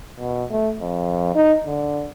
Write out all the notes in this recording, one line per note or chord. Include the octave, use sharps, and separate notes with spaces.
B2
A3
F2
D#4
D3